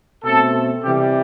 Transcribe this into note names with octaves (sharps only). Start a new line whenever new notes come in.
B2 A3 C4 A4
C3 E3 G3 G4